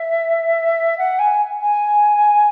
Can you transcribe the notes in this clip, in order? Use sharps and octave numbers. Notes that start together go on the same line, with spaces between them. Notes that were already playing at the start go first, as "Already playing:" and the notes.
Already playing: E5
F#5
G#5
G#5